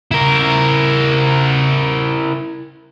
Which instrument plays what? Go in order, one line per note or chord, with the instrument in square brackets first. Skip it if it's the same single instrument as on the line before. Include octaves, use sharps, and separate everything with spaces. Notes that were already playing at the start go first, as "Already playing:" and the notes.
[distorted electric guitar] E4 A#4